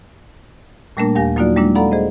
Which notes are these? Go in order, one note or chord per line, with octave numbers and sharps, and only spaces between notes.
A#2 G3 A3 A#3 D4 A#4
D#2 G4 F5 G#5 A#6
F#3 A#3 D#4 F4 F#4 D5
G3 G#3 A#3 D4 E4
A4 D5 F5 F#5 A#5 B5
G#4 C5 D#5